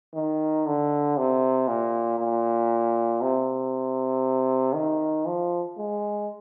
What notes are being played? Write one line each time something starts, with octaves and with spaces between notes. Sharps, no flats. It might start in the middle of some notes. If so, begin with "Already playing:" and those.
D#3
D3
C3
A#2
A#2
C3
D#3
F3
G#3